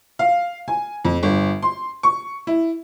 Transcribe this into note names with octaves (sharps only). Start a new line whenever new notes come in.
F5
G#5
F2
G1
C6
C#6
E4